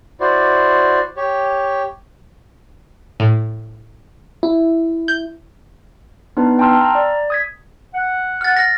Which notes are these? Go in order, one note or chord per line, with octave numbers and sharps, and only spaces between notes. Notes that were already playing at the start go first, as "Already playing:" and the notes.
E4 F#4 C5 D5
G4 C#5
A2
E4
G6
B3 D4 D#4 B4
G5 A5 A#5 C6 E6 F6
A#5
D5
D#6 G#6 B6
F#5
F6 A6
F6 A#6